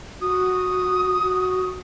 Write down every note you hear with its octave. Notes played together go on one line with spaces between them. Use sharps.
F#4 D#6
F#4